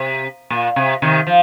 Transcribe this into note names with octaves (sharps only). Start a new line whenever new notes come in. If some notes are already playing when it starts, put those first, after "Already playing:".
Already playing: C3
A#2
C3
C3 D#3
F3